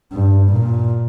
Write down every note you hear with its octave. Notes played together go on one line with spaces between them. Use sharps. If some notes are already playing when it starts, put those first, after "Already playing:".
G2
A#2